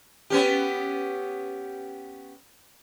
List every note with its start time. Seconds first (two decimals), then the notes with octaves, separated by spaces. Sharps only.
0.30 B3 C#4 G4